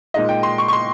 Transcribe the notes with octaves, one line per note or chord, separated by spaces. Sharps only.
A#2 G#3 D#4 D#5
G5
C6
C#6
C#6
C6